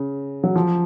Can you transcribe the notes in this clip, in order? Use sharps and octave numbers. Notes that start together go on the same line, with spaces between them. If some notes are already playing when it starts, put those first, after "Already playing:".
Already playing: C#3
F#3
F3